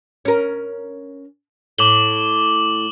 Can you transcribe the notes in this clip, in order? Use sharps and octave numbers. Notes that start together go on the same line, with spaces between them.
C#4 A#4
A2 D6 F#7 G7